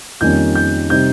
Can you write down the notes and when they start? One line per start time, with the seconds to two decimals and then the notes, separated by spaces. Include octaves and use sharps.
0.21 F2 D#3 G3 A#3 C#4 G6
0.55 G6
0.90 C3 G3 C4 D#4 G6